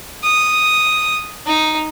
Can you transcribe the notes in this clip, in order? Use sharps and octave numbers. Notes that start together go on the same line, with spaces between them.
D#6
D#4